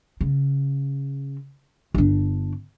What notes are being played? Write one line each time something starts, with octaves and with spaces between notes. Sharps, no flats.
C#3
G1 D4